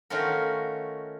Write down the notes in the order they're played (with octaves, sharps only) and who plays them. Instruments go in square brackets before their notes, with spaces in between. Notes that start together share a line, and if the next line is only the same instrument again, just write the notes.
[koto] D#3 A3 C#4 F4 F#4 A#4